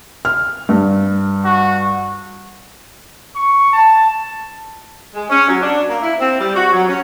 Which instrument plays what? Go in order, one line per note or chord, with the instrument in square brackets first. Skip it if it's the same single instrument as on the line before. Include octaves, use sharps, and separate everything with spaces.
[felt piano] F6
G2
[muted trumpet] F#4
[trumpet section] C#6
A5
[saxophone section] G#3
C#4
F#3
D4
A#3
E4
C4
G3
F#4
F#3
C#4